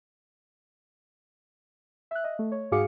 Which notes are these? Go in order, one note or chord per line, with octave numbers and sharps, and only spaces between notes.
E5 F#6
D#5
A3
C#5
G#2 F#4 G#4 F5 D6 C#7